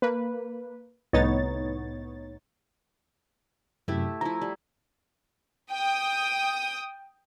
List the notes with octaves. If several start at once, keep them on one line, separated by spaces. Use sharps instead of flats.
A#3 B4
C2 A2 B3 D#4 C#5 A6
F#2 C3 A3 E4 G4
F3 E4 A#5
G3
G5 D#6